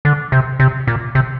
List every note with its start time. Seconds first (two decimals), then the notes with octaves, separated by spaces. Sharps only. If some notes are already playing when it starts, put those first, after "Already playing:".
0.05 D3
0.32 C3
0.60 C3
0.87 A#2
1.15 C3